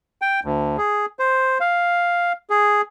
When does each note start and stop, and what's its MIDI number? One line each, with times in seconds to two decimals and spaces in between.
0.22 0.40 79
0.44 0.77 38
0.78 1.06 68
1.19 1.58 72
1.61 2.32 77
2.50 2.81 68